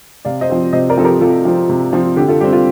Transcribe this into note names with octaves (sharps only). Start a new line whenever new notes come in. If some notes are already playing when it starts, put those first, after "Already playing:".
C3 D5 F5
C5 D#5
F3 C4
C3 C5 D#5
A#4 D5
F3 C4 A4
G4 A#4
C3 F4 A4
F3 C4
C3
F3 C4
D3 G4
F4 A4
G3 C4 G4
F4 A4